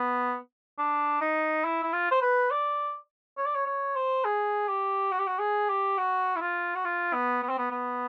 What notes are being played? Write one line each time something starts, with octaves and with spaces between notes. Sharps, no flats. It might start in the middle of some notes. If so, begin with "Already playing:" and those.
Already playing: B3
D4
D#4
E4
E4
F4
C5
B4
D5
C#5
D5
C#5
C#5
C5
G#4
G4
F#4
G4
F#4
G#4
G4
F#4
E4
F4
F#4
F4
B3
B3
C4
B3
B3